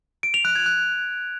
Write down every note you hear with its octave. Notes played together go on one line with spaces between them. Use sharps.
D7
F7
F#6
G#6
F#6